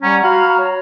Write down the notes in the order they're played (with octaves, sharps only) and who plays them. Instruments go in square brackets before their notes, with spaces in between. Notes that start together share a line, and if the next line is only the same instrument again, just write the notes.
[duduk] G3 [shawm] C#4 [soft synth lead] F#5 [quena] A#5
[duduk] F#4 [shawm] F5 [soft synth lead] B5
[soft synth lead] C#5